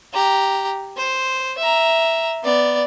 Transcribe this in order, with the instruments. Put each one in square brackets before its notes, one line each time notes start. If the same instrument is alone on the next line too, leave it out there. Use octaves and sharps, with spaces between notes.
[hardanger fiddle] G4 A#5
C5
E5 A#5
B3 D5